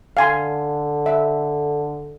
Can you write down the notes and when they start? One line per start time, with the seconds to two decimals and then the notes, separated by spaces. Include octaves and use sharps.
0.17 D3 F5 G#5 C6
1.06 E5